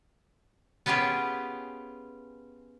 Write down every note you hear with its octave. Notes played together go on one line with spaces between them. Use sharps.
B3 C#4 F4 G4 G#4 B4